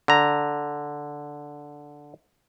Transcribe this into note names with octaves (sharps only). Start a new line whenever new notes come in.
D3 A#5